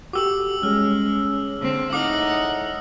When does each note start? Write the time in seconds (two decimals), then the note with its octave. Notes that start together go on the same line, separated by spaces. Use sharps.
0.13 F#4 G4 A4 D6 E6 F#7
0.63 G3 G#3 C#4 G#4 F6
1.60 D3 C4
1.93 A2 D#4 F#5 D6 D#6 F6